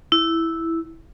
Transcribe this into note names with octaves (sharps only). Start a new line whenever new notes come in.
E4